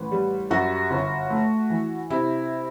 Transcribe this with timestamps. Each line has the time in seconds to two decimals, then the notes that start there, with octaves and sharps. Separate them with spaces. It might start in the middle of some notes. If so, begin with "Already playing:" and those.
Already playing: A1 B4
0.12 G3
0.51 F#2 F#4
0.91 G1
1.30 A3
1.70 E3
2.10 C3 E4